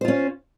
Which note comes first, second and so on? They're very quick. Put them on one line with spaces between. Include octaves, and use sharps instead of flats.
C5 F4 C#4